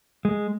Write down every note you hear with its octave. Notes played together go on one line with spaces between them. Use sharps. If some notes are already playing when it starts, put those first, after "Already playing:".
G#3